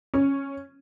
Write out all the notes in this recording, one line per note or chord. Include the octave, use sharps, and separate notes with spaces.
C#4